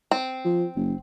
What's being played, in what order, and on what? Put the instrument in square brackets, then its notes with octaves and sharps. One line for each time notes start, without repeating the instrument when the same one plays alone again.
[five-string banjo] C4
[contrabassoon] F3
F#1